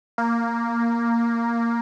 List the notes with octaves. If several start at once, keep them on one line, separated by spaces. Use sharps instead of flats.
A#3